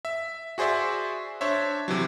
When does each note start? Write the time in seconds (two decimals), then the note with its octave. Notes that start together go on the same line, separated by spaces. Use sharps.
0.05 E5
0.58 F#4 G#4 C5 D5 E5
1.41 D4 C5 C#5 E5
1.88 C3 E3 F#3